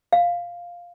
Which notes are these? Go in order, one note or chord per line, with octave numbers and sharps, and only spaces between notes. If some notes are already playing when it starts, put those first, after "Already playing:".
F5